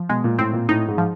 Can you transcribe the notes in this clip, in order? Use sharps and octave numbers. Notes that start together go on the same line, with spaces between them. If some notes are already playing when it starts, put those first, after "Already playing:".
Already playing: F3
B2 G#3
A#2
A2 C4
A#2
A2 D#4
G#2
F3